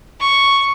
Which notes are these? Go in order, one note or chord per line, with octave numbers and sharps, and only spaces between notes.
C#6